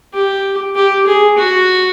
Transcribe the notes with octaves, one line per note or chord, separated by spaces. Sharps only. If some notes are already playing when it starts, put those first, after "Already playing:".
G4
G4
G#4
F#4